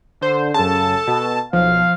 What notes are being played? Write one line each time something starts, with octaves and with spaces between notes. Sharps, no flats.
D3 C5
F#2 C#3 A4 A5
B2
B1 F3 F5